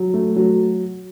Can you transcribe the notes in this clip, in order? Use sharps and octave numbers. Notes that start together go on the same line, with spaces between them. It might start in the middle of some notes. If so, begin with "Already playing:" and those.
Already playing: F#3
A3
F#3